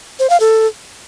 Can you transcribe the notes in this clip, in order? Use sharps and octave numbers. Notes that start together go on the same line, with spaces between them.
C5
F5
A4